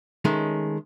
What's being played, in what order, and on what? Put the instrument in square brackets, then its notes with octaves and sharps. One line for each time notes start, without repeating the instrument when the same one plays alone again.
[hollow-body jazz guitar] D#3 G#3 A3 C#4